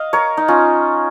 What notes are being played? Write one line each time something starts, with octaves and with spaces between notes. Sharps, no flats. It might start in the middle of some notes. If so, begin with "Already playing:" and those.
Already playing: D#5 F5
A#4 C#5
D#4
C#4 F4